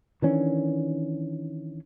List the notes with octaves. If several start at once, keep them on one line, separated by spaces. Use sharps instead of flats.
D#3 E3 C#4 D4